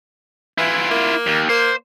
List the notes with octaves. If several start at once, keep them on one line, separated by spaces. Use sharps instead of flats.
E3 E4 F4
A#3
D#2
A#3 C5